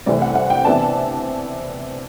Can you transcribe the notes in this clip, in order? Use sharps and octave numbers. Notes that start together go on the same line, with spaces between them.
C2 C3 E3 A3 C4 D5
F#5
F#5
G5
C3 E3 B3 D4 A5